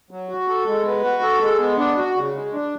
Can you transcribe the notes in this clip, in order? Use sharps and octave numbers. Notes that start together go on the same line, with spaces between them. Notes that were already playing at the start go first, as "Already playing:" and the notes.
F#3
F#4
A4
G#3
B3
F#4
A4
G#3
B3
D4
F#4
C#3
G#3
D4